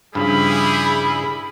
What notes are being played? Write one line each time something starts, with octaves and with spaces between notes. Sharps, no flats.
G2 C#3 F3 G3 E4 G#4 B5